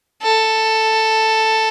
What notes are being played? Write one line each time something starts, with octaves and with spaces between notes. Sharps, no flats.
A4